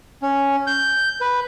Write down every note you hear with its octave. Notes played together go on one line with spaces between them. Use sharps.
C#4
G6
B4